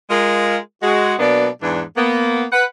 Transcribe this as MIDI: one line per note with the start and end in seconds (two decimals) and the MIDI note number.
0.10 0.57 56
0.10 0.57 65
0.10 0.57 70
0.82 1.14 56
0.82 1.14 66
1.19 1.49 47
1.19 1.49 54
1.19 1.49 58
1.19 1.49 59
1.19 1.49 62
1.19 1.49 74
1.62 1.82 40
1.62 1.82 44
1.62 1.82 52
1.62 1.82 62
1.96 2.44 58
1.96 2.44 59
2.52 2.65 71
2.52 2.65 78